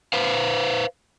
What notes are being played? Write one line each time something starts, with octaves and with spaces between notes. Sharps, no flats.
B4 C5 F5